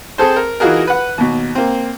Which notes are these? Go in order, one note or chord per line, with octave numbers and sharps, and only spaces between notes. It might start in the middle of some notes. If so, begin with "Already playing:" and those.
C4 G#4 A4 C5
A#4
E3 D#4 F4 F#4 G#4 A#4
B4 F#5
D#2 B2
A#3 C4